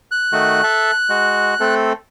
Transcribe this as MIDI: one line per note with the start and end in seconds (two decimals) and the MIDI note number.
0.11 1.75 90
0.32 0.62 51
0.32 0.62 57
0.32 0.62 66
0.63 0.91 69
0.63 0.91 76
0.63 0.91 81
1.09 1.54 56
1.09 1.54 66
1.60 1.93 57
1.60 1.93 60
1.60 1.93 69